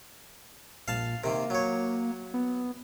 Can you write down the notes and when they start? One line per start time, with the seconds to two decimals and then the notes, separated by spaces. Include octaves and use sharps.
0.88 A#1 F5 A5
1.24 C3 D#3 A#3
1.50 F#3 C#5
2.34 B3